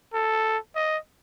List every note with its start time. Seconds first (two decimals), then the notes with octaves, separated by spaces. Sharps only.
0.14 A4
0.76 D#5